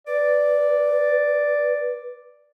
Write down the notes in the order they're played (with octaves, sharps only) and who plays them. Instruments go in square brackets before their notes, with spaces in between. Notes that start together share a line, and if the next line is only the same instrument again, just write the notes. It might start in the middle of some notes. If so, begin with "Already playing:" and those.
[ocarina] B4 [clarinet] D5